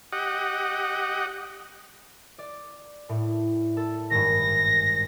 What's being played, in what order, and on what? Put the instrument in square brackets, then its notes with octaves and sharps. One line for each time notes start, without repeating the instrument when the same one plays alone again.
[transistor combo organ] G4 D#5 F#5
[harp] D5
A2
A4
[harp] G#1 G2 [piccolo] A#6